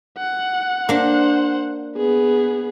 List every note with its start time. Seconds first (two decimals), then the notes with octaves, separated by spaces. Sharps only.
0.18 F#5
0.89 A#3 D4 C5 F#5
1.97 B3 G#4